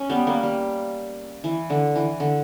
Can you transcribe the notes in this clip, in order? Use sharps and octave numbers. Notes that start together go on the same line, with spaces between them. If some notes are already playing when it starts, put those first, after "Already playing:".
Already playing: C#4
G3 B3
A#3
G3
E3
D3
E3
D3